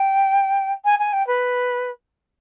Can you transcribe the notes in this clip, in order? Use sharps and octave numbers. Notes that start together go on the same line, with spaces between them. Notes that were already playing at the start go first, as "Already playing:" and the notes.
Already playing: G5
G#5
G#5
G5
B4